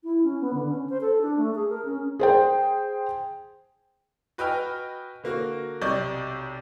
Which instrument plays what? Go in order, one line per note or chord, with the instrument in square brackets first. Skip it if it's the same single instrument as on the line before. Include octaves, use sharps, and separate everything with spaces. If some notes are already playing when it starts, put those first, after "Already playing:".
[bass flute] E4
C#4
B3
D3
C#4
C5
A4
D4
A3
G#4
A#4
C#4
[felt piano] G#4 C5 G5
[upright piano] F#4 B4 D#5 G5 G#5 F6
D3 A#3 F#4
B1 C3 D5 D#5 C#6 G6